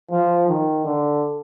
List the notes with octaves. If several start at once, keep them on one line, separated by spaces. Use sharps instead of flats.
F3
D#3
D3